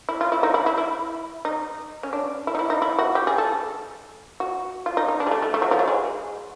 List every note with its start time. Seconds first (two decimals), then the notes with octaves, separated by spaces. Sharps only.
0.09 E4
0.21 F4
0.32 E4
0.43 D#4
0.54 E4
0.66 E4
0.77 E4
1.45 D#4
2.03 C#4
2.13 D4
2.47 E4
2.55 D#4
2.59 E4
2.70 D#4
2.82 E4
2.99 F#4
3.15 G4
3.27 G#4
3.38 A4
4.40 F#4
4.86 F4
4.97 D#4
5.08 D#4
5.20 D4
5.27 G#3
5.31 A3
5.42 A3
5.54 A3
5.62 F#3
5.71 F3
5.79 F#3
5.88 G#3